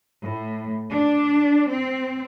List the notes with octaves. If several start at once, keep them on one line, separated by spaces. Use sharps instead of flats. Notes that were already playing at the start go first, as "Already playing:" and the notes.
A2
D4
C4